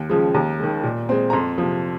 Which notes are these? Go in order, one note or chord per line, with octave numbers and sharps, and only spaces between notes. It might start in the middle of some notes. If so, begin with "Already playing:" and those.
Already playing: D#2
C#3 F3 G#3
D#2 A#5
D#3 G#3
A#2
G#3 C4
A#5
F2 C6
C3 F3